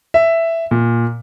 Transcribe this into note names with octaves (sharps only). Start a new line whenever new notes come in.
E5
A#2